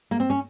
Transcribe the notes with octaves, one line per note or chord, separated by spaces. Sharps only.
A#3
C4
C#4